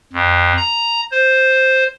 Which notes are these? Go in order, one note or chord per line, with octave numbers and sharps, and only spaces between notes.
F2
A#5
C5